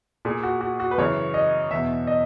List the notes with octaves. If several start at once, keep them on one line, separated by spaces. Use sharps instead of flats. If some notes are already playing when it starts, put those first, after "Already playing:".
A#2 G#4
F#4
F#4
F#4
B4
F#2 C#3 E3 C#5
D#5
E2 B2 E5
D#5